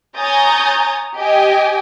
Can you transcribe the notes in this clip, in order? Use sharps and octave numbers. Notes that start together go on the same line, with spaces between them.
C#5 G#5 A#5 D#6 G6 A6
G4 D#5 G5 G#5